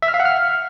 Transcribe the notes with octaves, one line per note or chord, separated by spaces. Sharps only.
E5
F6
F5
F#5
F6